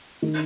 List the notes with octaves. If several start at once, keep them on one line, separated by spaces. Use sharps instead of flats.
D#3